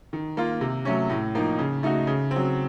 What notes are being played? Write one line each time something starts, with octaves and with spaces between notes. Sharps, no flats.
D#3
A#3 F4
C3
F#3 A3 C#4
A2
F3 A#3 D#4
C#3
A3 D#4 F#4
C#3
C4
F#3